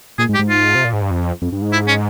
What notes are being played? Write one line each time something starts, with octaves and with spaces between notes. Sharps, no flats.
A#2 G#4
G#2
G4
G#2
F4
C3
A#2
G#2
G2
F2
F2
G2
G#2
E4
C#4